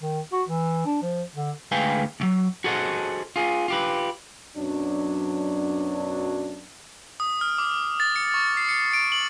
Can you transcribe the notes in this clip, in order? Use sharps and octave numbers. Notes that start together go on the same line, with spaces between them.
D#3
F#4
E3
D4
F3
D3
D2 G#3 B4 F5 G5 G#5
D2 F#3
F#4 G#4 A4 C5 D#5 F#5
F4 G#4
F4 G4 B4
F#2 B2 F#3 D4
D#6
F6
D6
A6
C#7
C#6
C7
C#7
D7
F#7